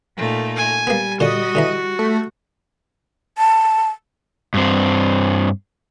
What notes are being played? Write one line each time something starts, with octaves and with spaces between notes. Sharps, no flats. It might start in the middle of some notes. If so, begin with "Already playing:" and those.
A#2 A3 D#4
G#5
G3 A#3 B3
A#2 D3 F#4 D#5
D3 E3 A#5
A3
A5
G2 C4